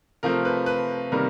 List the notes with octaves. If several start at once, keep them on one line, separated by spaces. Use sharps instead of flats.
C3 F3 A3 C4 A#4
B4
B4
C3 D#3 G3 A#3 A#4